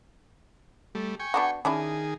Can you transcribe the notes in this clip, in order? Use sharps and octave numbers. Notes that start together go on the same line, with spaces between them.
G3 A3
G5 G#5 C#6
B3 D4 F#4
D#3 C#4 D4 E4 G#4